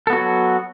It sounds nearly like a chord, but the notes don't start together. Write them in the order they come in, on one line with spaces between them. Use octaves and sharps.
A4 B3 F#4 F#3